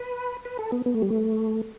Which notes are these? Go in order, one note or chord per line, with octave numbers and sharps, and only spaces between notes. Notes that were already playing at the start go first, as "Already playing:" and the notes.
Already playing: B4
B4
A4
B3
B3
A3
G3
A3